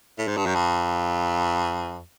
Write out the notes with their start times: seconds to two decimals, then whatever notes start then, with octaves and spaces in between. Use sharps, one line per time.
0.18 A2
0.28 G#2
0.37 G2
0.46 F#2
0.55 F2